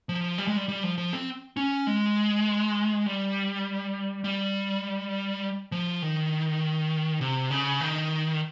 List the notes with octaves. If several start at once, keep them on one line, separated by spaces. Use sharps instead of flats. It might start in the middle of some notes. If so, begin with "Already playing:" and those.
F3
G3
G#3
G3
G3
F3
F3
C4
C#4
G#3
G3
G3
F3
D#3
C3
C#3
D#3